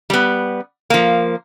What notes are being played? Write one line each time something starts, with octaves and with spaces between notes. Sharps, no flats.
G3 B3
F3 A#3